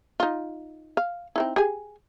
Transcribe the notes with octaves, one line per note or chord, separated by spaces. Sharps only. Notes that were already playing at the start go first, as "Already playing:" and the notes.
D#4 F4
F5
C4 D#4 E4
G4 G#4 G#5